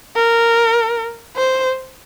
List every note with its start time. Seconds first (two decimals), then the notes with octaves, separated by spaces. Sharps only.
0.16 A#4
1.36 C5